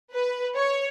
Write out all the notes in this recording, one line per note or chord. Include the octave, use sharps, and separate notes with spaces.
B4
C#5